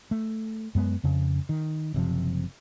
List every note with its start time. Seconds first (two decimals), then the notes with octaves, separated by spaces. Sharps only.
0.11 A3
0.75 F#2 G#3 B3
1.04 F2 C#3
1.49 D#3
1.94 F#1 C3 F3